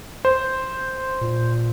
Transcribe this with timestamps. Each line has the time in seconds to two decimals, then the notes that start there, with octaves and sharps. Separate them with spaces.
0.25 C5
1.21 A#2